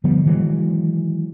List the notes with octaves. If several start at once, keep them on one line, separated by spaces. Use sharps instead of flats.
D3 F3 G3 B3
D#3 E3 F#3 G#3